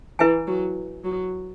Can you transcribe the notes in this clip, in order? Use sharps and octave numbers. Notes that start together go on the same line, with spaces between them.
E3 E4 B4 E5 G#5
F#3
F#3